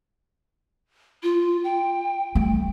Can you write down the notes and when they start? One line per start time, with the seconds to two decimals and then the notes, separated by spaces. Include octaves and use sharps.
1.23 F4
1.64 G5
2.35 G3 A3